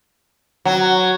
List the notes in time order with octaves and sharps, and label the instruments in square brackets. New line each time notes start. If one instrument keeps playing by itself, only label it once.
[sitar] F#3